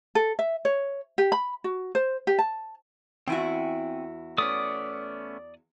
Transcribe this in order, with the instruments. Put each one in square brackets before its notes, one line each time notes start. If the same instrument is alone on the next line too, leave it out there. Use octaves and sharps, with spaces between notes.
[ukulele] A4
E5
C#5
G4
B5
F#4
C5
G4
A5
[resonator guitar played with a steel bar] E2 E4 F#4 [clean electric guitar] C4 G5 G#5
[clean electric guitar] A3 B3 C#4 [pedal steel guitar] D5 D#6